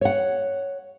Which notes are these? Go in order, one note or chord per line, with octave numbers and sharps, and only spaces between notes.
C#5 F#5